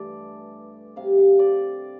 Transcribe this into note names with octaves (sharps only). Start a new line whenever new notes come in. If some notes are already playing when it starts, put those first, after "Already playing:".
Already playing: G2 E3 A3 D5
C3 G3 F5
F5
D5